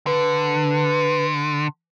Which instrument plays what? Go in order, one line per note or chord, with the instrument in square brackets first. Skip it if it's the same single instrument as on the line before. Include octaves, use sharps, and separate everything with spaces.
[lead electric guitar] D3 [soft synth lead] B4